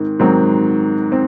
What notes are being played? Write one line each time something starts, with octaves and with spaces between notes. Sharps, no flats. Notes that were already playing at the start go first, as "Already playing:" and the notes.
Already playing: G#2 D#3 C4
G#2 D#3 F#3 C4
C4